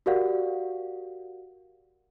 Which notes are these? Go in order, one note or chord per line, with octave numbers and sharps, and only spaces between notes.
F#4 G4 A#4 D5 F5 F#5